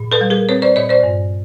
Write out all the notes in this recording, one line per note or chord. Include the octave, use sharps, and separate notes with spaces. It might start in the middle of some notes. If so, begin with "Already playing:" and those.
Already playing: A#2
A4 B4
G3
G#4 A#4
C4 B4 C#5
C5 D5
A#2 C#5 D#5
C5 D5
G2